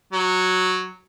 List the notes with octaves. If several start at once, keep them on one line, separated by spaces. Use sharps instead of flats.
F#3